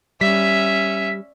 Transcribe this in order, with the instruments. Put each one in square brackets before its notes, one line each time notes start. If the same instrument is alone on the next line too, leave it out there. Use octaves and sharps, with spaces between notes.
[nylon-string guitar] G3 [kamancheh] C#4 E5 [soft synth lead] B6